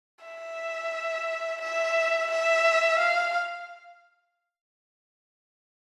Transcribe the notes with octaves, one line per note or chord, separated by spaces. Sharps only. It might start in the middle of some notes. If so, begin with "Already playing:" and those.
E5
E5
E5
F5